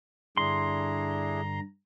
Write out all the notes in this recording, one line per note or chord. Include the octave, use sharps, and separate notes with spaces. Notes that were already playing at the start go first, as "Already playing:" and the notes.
G2 D3 D4 E4 G#4 A#5 C6